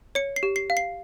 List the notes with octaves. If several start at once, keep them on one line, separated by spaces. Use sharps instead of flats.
C#5 C#7
C7
G4
C7
F5
C7